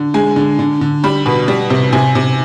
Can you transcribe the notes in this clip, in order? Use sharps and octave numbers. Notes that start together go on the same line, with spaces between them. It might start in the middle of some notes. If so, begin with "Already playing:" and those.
Already playing: D3
G#3 G#5
D3
D3
D3
G3 B5
B2
G3
C3
C3 G#5
C3